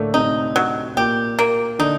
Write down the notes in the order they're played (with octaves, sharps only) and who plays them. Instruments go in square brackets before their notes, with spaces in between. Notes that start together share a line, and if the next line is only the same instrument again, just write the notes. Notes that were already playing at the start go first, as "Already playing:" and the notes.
Already playing: [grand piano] A2 D3 A3 D4 [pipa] A#3
[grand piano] C3 C4 [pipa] D#4
[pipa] F#3
[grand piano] A#2 A#3 [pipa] G4
[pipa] A#3
[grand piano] D3 D4 [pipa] D#4